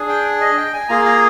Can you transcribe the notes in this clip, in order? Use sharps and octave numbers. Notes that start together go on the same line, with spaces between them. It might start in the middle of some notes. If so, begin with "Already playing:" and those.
Already playing: D4 G#4
G5
D#5
G5
G#5
A#3 F4 G#4 A#5
A#5